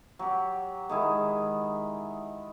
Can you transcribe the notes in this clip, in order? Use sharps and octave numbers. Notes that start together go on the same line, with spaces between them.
F#3 G4
D#3 G#3 E4